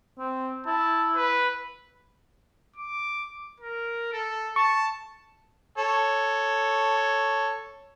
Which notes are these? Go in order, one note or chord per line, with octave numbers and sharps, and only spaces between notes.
C4
E4 A5
B4
D6
A#4
A4
A5 C#6
A4 C#5